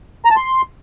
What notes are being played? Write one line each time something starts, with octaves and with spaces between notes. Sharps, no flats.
A#5
A5
C6